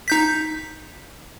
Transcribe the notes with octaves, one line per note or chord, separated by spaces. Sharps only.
D#4 G6 B6